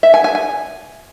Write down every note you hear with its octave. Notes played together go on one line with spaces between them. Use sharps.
E5
G#5
G#5
G#5